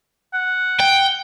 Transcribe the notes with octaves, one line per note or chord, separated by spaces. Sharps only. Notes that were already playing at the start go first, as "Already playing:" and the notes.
F#5
G5